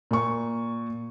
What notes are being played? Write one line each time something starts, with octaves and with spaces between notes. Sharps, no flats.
A#2 C#6